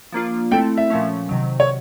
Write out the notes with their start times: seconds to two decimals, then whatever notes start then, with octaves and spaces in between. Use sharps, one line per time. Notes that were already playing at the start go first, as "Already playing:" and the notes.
0.12 F3 A#3 D4 F4
0.51 A3 C4 E4 A4 G5
0.77 E5
0.90 A#2 F3 A3 C#4
1.29 C3 D#3 F#3
1.60 C#5